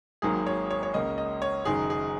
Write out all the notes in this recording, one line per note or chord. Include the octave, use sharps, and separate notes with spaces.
G#1 G#2 D#3 F#3 A#3 G#4
C#5
C#5
C#5
C#2 C#3 A#3 C#4 D#5
D#5
C#5
F#1 F#2 D#3 G#3 D#4 G#4
G#4